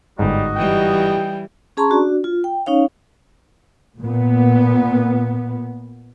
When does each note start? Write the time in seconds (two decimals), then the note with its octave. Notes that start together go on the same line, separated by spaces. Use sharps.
0.19 G1 G#2 G3 D#4 F#4 D#5
0.56 E3 G3 G5
1.77 C#4 G#4 A5 A#5 C6 C#6
1.90 D4 F#4 D5
2.24 F4
2.44 G5
2.66 C#4 D#4 C#5 F5
3.99 A#2 B3